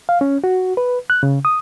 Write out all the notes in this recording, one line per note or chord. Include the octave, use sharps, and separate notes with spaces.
F5
C#4
F#4
B4
F#6
C#3
D#6